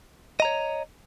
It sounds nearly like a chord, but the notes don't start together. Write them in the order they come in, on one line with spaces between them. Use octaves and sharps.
D#5 A#5 C#5